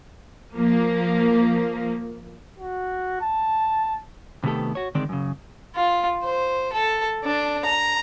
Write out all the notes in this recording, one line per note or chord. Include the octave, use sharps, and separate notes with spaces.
F3 A#3
F#4
A5
C3 D#3 A3 B3 G4 A4
F#4 C#5
D3 D#3 G#3 C4 D5
F#2 C#3
F4
C5
A4
D4
A#5